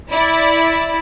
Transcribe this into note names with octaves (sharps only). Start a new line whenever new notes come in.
E4 D5